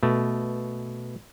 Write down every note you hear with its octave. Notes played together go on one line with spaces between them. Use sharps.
B2 A3